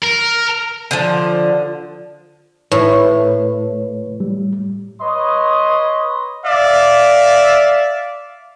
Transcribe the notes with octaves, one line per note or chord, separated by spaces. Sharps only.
A#4
D3 F3
A2 B4 C#5
G3
B4 C#5 D#5 C6 D#6
D5 E5 F5